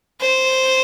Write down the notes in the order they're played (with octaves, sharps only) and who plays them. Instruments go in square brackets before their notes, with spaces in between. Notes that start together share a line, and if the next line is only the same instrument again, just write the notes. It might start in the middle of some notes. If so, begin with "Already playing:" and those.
[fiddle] C5